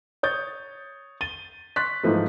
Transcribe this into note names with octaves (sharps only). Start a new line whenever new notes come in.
C#5 D#6 G6 A6
A6 D#7 G7
C6 C#6 F#6 A6 B6
G#2 E3 F3 A3